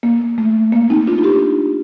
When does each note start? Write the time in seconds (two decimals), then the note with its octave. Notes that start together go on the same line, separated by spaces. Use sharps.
0.03 A#3
0.38 A3
0.73 A#3
0.90 C4 D#4
1.07 D4 F4
1.18 F4
1.23 D#4 G4